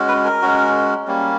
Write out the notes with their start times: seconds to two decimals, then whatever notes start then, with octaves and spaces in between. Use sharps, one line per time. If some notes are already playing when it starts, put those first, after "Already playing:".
Already playing: G#3 C#4 F#4
0.08 B4
0.25 A#4
0.42 G#3 C#4 F#4
1.07 G3 A#3 C#4